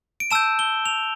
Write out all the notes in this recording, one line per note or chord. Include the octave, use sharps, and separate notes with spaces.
D7
A5 E6 G6 E7
G7
F7